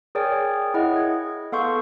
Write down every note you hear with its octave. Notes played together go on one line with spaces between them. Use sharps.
G#4 A#4 C#5 D5 G5 G#5
E4 G#4 D#5 F#5
G#6
B3 A4 F5 C6 C#6 G6